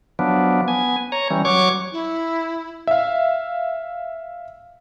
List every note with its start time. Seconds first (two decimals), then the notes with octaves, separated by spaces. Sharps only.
0.19 F3 F#3 B3 D4
0.68 B3 G#5
1.12 C#5 A#5
1.30 E3 G3 C#4
1.45 F#3 C#5 C#6 D6
1.92 E4
2.87 E5 F5